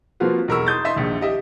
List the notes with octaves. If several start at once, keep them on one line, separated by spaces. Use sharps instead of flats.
F3 A#3 C4 F4 F#4 B4
B1 E2 A#4 B5 C#6 E6
C6 D#6 G6 A6
D#5 E5 C6
A#1 D#2
G4 D#5 E5